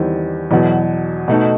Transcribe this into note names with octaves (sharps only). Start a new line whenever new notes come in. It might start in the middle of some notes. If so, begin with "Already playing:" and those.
Already playing: E2 D#3 G3 C4
E2 B2 F#3
B2 A3 D#4